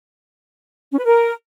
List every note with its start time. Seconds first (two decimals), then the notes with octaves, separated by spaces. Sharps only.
0.92 C#4
0.98 B4
1.04 A#4